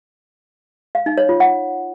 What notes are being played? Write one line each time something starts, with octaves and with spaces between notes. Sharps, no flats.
F5
D#4
C#5
F4
F#5